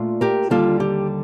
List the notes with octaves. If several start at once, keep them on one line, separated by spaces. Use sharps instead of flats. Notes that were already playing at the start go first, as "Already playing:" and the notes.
Already playing: A#2 A3 D4 F4
G4 A#4
D#2 D3 G3 F4 A4
G4